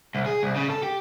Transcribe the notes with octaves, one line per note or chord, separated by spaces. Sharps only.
C2
G#4
C2
C#3
A4
G4